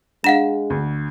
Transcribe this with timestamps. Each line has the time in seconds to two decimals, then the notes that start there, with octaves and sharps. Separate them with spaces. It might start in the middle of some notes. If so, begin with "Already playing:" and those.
0.24 G#3 D4 F5 F#5 E7
0.70 D2